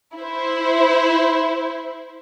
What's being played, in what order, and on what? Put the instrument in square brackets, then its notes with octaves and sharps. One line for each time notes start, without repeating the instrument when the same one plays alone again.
[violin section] E4 C5